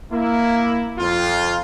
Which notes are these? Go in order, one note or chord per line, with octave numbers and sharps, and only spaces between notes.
A#3 E4
F2 F4